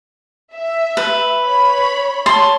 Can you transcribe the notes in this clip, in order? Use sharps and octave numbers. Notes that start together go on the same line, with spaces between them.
E5
B4
C#5 B5
C#5 A5 C6